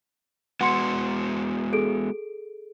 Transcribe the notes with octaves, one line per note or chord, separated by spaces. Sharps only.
G#3 B3 F#4 F#5 C6 C#7
G#4 A4 D7